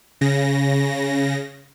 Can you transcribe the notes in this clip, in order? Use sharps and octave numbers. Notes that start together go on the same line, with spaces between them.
C#3 A#6